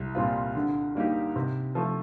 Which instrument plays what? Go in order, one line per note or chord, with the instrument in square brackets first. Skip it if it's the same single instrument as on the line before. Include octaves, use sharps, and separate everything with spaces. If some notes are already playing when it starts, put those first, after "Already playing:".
Already playing: [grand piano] C2
A#2 G3 C4 F4
D3
G3 A#3 D#4 G4
C3
F3 A3